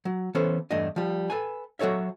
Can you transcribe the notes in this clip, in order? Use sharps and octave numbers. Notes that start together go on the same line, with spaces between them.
F#3
E3 B3 C#4 A4 C5
E2 G2 A3 D4 D#5
F3 G3
A4 B4 G#5
F#3 F#4 A4 C#5 E5